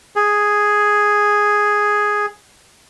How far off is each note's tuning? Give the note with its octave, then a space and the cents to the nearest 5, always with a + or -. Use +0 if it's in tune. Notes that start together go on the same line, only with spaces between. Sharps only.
G#4 +0